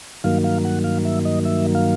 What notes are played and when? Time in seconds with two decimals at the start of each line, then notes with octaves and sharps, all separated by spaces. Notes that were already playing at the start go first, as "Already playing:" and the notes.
0.24 G2 D#3 F#3 A#3 F5
0.44 F5
0.65 F#5
0.84 F5
1.05 E5
1.25 D#5
1.45 E5
1.75 F5